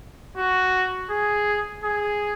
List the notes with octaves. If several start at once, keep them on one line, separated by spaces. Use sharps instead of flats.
F#4
G#4
G#4